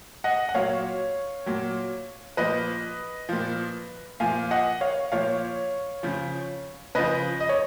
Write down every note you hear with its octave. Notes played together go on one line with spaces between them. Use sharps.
D#5 F#5
F#5
A#2 F#3 C#5 F5
A#2 F#3
A#2 F3 B4 D#5
A#2 F3
A#2 F3 F5 G#5
D#5 F#5
C#5 F5
A#2 F3 C#5 F5
C#3 F3
C#3 F3 B4 D#5
D#5
C#5